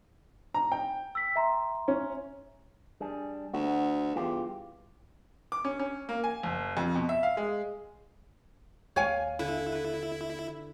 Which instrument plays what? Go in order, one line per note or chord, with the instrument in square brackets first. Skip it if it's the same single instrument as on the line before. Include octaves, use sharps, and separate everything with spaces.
[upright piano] A#5
G5
[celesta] E6 B6
E5 A#5 C6
[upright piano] C#4
[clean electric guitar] G3 D4 G#4
[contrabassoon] D2 [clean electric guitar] F#4
[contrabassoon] E2 [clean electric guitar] G2 F4 G4
[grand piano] D6
C#4
C#4
A#3
G#5
F#1
F2
B2
E5
F5
G#3
[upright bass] D#2 [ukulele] C#5 F5 G#5
[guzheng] D3 [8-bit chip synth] E4
[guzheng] B4